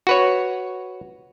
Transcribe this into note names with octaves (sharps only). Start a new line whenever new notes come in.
F#4 B4 C#5